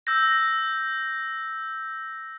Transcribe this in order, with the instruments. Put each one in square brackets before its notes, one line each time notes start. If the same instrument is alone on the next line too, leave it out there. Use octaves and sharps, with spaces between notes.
[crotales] E6 G6 A#6